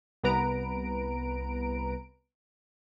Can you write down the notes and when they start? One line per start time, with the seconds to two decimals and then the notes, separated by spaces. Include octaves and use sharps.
0.23 C2 B3 B4 A#5 D7